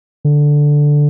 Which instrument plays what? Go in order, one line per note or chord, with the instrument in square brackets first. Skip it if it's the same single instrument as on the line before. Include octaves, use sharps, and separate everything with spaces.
[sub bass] D3